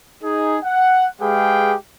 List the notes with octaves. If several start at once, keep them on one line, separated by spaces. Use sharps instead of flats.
D#4 G#4
F#5
G#3 G4 G#4 B4 F5 G5